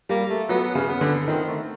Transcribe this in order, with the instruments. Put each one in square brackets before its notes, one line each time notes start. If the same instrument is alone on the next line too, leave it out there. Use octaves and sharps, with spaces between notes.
[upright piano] G3 [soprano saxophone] A#3
[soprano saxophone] A3
[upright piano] F#3 [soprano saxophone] B3
[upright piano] C#3
[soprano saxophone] B3
[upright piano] D3
[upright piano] D#3 [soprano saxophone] C4
[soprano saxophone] A3